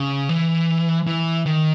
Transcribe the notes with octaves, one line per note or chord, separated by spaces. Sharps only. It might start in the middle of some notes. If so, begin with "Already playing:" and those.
Already playing: C#3
E3
E3
D#3